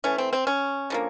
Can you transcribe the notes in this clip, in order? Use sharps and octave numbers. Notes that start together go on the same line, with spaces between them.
E3 A3 C#4
C4
C4
C#4
D3 F3 A#3